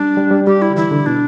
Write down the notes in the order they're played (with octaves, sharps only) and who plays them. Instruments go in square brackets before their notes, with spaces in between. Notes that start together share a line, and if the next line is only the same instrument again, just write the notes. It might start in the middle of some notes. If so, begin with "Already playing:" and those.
Already playing: [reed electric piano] G3 [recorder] D4
[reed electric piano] G3
G3
[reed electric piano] G3 [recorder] G4
[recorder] E4
[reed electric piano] D3
[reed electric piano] E3 [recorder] E4
[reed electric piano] D3
[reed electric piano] B2 [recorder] D4